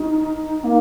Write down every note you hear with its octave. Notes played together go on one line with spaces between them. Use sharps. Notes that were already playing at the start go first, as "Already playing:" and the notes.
Already playing: D#4
A#3